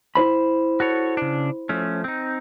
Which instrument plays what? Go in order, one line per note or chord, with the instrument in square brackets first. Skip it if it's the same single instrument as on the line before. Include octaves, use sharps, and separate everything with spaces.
[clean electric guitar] E4 C5 B5
[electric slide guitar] F#4 A4 C#5
C#3 D4
F3 A3 C#4
C4 D#4